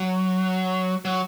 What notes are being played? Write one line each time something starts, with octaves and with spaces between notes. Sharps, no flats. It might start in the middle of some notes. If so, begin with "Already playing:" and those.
Already playing: F#3
F#3